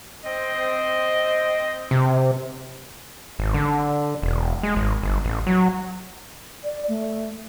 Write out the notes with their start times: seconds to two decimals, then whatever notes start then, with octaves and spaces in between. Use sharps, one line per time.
0.24 C4 D#5
1.91 C3
3.39 G#1
3.54 D3
4.22 E1
4.63 G#3
4.76 G#1
5.02 G1
5.25 A1
5.47 F#3
6.64 D5
6.88 A3